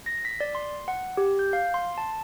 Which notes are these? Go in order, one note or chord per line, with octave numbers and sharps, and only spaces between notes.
A#6
B6
D5
C6
F#5
G4
G6
F5
C6
A5